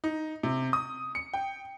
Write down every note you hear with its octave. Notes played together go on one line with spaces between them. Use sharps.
D#4
C3
D#6
C#7
G5